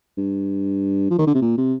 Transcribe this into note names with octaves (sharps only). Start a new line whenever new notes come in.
G2
F3
D#3
D3
C3
A#2
C3